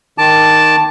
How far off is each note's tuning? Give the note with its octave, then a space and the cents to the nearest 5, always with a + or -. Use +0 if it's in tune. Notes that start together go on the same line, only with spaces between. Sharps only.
D#3 +0 A5 +0 D6 +0